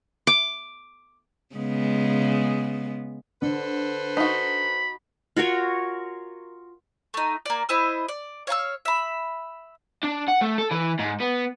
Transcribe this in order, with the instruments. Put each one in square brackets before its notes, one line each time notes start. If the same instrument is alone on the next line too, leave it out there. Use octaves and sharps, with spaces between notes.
[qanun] D6
[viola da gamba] C#3 G#3 B3
[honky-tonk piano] D3 [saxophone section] A4 B4 C5
[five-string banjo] D#4 F#4 [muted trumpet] B5
[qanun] F4 F#4 A#4 C#5
[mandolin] A3 D#4
A#3 D5
E4 C5 D#5 E6
D5
C#5 F5 A5 E6
E5 B5
[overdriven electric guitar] D4
F#5
A3
A4
E3
G#2
B3